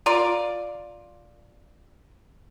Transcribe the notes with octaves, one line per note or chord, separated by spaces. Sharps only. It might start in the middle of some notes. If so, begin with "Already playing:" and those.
F4 A#4 D5